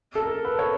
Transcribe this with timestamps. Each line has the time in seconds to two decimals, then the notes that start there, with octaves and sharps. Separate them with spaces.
0.15 A4
0.23 A#4
0.45 B4
0.59 C#5